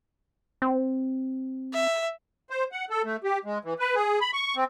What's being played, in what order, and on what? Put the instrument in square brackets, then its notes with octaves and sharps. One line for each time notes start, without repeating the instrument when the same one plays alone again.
[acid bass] C4
[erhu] E5
[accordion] C5
F#5
A4
A3
G4
G#3
E3
B4
G#4
B5
C#6
C4